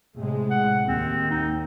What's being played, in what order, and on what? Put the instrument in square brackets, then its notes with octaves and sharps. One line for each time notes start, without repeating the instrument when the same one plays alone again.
[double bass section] A2 C3 G#3
[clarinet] F#5
[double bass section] D#2 [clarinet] C4
[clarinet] D#4